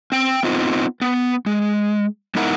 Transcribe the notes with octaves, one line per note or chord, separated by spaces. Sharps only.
C4 G5
B3 C4 D#4 F4
B3
G#3
G#3 B3 D#4 E4 A#4 F#5